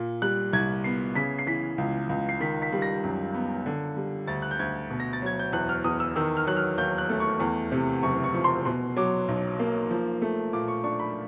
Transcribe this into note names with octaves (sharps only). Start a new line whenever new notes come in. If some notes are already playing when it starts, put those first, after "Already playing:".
Already playing: A#2
G3 F#6
C2 G#6
B3 C7
C#3 B6
C7
E3 B6
C#2
C#2
C7
D#3 B6
B6
G3
A#6
F#2
B3
D3
G3
D2 A6
F#6
G6
D2 G#6
B2
A#6
A6
F#3 G#6
G6
E2 F#6
F6
E2 D#6
E6
D#3 E6
F6
F#3 F#6
F6
D#2 G6
F#6
A3
C#6
E2
C3
F#1 C#6
C#6
F3 C#6
C6
B2 C6
F#3 D6
B1
A#3
F3
A3
A#2 D6
C#6
D4 C#6
B5